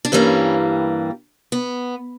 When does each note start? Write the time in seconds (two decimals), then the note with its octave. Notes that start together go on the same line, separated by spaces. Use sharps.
0.05 D4
0.12 G2 E3 G3 A#3 C#4
1.52 B3